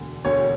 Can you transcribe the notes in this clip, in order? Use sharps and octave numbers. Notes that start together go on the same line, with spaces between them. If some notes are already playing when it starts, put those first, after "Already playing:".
Already playing: E1 D2 D3
E1 D2 D3 C#5